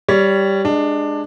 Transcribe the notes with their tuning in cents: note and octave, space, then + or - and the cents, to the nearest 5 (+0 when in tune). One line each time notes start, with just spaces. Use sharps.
G3 +0 C#5 +15
G#3 +0 D4 +15 G4 +0